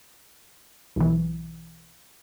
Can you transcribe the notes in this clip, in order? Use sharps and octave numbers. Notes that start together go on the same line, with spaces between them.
B1 E3